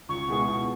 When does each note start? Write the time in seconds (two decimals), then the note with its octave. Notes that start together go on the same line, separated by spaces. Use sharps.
0.09 C#2 C#6
0.28 B2 G#3 E4 G#4
0.48 B2